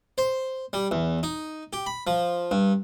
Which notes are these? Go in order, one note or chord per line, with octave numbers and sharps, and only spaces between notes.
C5
G3
E2
D#4
G4
B5
F3
G2